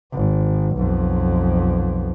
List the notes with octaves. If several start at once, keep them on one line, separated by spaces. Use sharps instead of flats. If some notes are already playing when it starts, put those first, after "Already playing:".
G#1
B1 F2